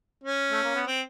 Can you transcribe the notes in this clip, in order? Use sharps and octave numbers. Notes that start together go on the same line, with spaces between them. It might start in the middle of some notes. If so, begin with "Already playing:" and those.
C#4
A3
A#3
B3
C4